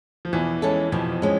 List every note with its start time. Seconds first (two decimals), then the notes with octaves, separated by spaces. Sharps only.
0.25 F3
0.33 E2 B2 E3
0.62 G#3 C#4 E4 A4
0.92 F2 B2 F3
1.22 G#3 C#4